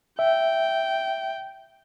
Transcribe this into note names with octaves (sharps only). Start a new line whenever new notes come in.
E5 G5